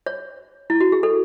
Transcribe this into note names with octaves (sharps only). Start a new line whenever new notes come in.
C#5
E4
F#4
G#4
A4